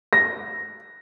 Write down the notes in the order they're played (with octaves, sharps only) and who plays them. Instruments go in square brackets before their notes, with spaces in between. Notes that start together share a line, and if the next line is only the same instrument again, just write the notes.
[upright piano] A#6